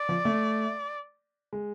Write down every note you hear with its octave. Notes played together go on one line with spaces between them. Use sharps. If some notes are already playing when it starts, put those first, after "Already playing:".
Already playing: D5
F3
A3
G#3